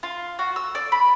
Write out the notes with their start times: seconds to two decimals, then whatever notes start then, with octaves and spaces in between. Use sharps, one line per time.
0.03 F4
0.39 F#4
0.56 E6
0.75 D5
0.92 B5